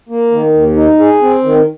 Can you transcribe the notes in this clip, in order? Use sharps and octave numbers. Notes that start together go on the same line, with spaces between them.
A#3
D#3
D#2
D#4
G#4
C4
D#3